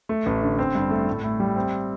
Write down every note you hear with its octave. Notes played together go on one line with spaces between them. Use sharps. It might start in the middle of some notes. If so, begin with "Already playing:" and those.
A3
A1
D3
C4
G2
A3
A2
A2
G3
C4